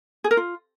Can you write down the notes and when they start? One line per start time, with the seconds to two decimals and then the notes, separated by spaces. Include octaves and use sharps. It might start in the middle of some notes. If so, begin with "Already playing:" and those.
0.24 G#4
0.31 A#4
0.37 F4